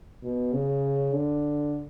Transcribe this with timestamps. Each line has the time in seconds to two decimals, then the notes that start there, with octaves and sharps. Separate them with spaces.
0.23 B2
0.52 C#3
1.14 D3